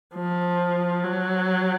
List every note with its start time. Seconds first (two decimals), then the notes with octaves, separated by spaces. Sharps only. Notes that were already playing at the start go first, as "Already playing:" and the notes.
0.15 F3
1.03 F#3